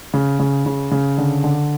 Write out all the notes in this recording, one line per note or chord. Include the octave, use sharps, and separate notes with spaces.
C#3
C#3
C#3
C#3
D3
D3